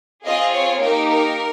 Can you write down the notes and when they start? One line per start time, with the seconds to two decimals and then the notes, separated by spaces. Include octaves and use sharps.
0.24 C4 F4 G#4 D#5
0.52 C#5
0.81 A#3 D#4 G4 A#4
1.09 A#4